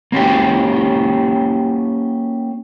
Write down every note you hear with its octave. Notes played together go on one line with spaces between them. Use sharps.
A#3 C#4 F#4 G4